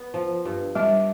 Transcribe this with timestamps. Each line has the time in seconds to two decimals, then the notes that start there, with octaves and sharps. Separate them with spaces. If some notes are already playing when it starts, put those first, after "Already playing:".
Already playing: B3
0.14 F3
0.45 G2
0.75 G3 D4